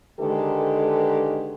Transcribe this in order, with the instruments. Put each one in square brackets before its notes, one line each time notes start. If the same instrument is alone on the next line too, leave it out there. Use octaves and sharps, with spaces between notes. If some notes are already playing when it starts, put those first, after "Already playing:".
[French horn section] D3 D#3 G#3 G4 A4 B4